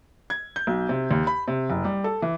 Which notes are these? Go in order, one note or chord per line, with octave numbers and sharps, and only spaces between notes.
G#6
G6
B1
C3
D#2
B5
C3
F#1
G3
A4
E3